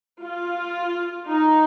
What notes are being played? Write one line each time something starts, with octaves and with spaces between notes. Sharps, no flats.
F4
D#4